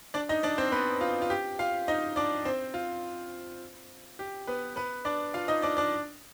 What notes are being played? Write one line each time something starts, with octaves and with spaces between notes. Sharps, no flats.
D4 D5
D#4 D#5
D4 D5
C4 C5
B3 B4
F4
F4
G4
F4 F5
D#4 D#5
D4 D5
C4 C5
F4
G4
B3 B4
B3 B4
D4 D5
F4 F5
D#4 D#5
D4 D5
D4 D5